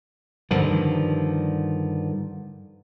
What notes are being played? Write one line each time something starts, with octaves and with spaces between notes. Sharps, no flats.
G2 D3 D#3 F3